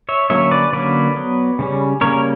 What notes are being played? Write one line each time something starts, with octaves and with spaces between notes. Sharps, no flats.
C#5 E5
D3 F#3 A#3 C#4 C#5 E5
B4 D5
D3 F#3 A#3 C#4 B4 D5
F#3 B3
C#3 G3 C#4
C#3 G3 A#3 C#4 A#4 C#5